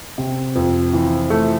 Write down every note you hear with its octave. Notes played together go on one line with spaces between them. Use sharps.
C3
F2
E3
A3